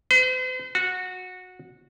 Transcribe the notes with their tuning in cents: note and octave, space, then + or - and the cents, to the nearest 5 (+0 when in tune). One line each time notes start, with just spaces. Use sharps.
C5 -45
F#4 -15